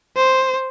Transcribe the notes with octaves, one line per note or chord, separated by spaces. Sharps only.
C5